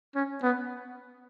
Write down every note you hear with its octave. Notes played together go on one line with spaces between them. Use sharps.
C#4
B3